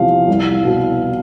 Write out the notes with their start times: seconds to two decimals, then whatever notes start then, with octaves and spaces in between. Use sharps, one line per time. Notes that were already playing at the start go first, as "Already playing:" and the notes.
Already playing: E2 C3 F3 F5
0.28 C2
0.65 B2